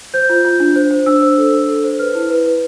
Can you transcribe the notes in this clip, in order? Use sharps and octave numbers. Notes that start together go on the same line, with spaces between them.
C5 G6
F4
F4
D4
C5
C5
D4 E6
C5
A4
D4
A4
C5
B4 F6
E4
B4
B4